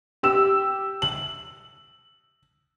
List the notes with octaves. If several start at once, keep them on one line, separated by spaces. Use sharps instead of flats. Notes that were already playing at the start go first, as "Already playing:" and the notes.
G4 E6 E7
F#7